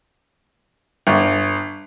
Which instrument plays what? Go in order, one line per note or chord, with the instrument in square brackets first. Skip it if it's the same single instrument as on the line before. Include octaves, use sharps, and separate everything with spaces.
[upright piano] G1